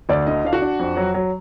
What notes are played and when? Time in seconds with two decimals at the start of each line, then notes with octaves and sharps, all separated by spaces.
0.09 D2 D5
0.27 D3 D#5
0.44 D4 F5
0.53 F#4 F#5
0.62 D4
0.79 F2
0.97 F#3
1.14 F#3